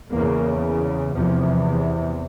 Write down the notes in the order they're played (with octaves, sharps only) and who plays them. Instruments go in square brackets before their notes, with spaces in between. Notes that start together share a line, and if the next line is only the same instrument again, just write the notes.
[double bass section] E2 C#3 A#3
E2 C3 F3